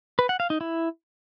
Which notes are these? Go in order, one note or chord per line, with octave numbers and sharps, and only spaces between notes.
B4
F#5
F5
D#4
E4